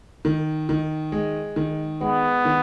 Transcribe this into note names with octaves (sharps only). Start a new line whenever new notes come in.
D#3
D#3
G#3
D#3
G#3 B3
D#3